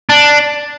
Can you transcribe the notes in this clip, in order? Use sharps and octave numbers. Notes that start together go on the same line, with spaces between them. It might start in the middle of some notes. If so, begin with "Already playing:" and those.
D4